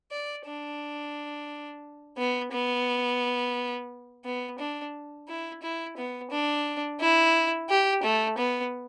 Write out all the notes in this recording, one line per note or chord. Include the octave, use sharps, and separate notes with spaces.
D5
D4
B3
B3
B3
D4
E4
E4
B3
D4
E4
G4
A3
B3